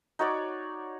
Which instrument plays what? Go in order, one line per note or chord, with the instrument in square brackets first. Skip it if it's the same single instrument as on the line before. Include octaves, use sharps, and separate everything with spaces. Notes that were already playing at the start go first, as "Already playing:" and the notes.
[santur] D#4 F#4 C#5 D5